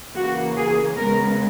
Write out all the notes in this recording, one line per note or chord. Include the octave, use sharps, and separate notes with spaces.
C#3 E3 A#3 F#4
G#4
C#3 G#3 B3 A#4